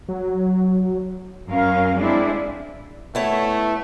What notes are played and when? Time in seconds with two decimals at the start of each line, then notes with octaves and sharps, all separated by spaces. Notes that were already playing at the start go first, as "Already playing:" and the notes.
0.09 F#3
1.49 F#2 C#4 A#4 F5
1.97 G#3 C4 D4 E4 G#4
3.15 A3 B3 E4 C#5